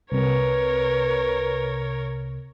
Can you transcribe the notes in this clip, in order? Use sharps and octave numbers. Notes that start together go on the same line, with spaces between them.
C2 C3 A#4 B4 C#5